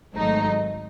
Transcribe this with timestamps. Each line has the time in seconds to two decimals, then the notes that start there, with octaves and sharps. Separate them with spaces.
0.14 G#1 G#2 F#3 A3 D#4